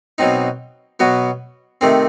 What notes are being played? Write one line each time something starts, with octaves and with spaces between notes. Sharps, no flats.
B2 F#3 C4 D#4
B2 F#3 B3 F#4
C3 D#3 A3 C4